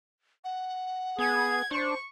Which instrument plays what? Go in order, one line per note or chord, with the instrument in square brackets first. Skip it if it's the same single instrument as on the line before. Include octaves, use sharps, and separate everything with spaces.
[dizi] F#5
[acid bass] B3 [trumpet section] G#4 [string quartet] G#6
[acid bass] D4 [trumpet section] C5 [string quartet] C#6